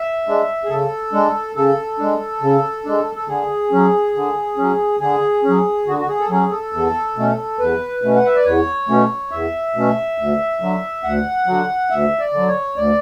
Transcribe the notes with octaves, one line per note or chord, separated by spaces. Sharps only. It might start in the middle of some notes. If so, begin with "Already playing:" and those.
Already playing: E5
G#3 D4
G#4
C#3 A4
G#3 D4
C#3 A4
G#3 D4
C#3
G#3 D4
A4
D3 G#4
F#3 C#4
D3
F#3 C#4
D3 G#4
C#4
F#3
D3 F#4
F#4
G#4
A4
F#3 C#4 G#4
A4
E2
B2 A3 C#4
E2 B4
B2 A3 C#4
F#5
E5
D5
E2 C#5
B2 A3 C#4
E2 E5
B2 A3 C#4
D2
D3 F#3
D2 F#5
D3 F#3
D2 E5
D5
D3 F#3
C#5
D2 D5